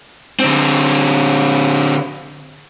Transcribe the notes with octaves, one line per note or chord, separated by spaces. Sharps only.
D3 C4